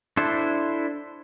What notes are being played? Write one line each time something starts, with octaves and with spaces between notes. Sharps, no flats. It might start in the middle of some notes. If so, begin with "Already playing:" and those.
D4 E4 A4 C5